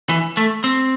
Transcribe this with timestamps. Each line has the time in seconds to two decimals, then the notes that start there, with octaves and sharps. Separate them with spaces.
0.09 E3
0.37 A3
0.64 C4